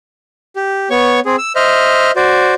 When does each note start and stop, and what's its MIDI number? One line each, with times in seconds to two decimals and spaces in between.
0.56 0.89 67
0.90 1.20 59
0.90 1.20 73
0.90 1.20 85
1.25 1.36 60
1.25 1.36 68
1.38 1.53 88
1.56 2.11 72
1.56 2.11 75
1.56 2.11 76
1.56 2.11 89
2.16 2.54 66
2.16 2.54 72
2.16 2.54 74